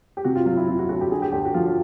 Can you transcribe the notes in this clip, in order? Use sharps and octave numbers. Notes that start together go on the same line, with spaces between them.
G4
C3 F#4
F4
F#3 F4
E4
C3 F4
F#4
D2 F#4
G4
D3 G#4
G4
D2 G4
F#4
F3 F4
F4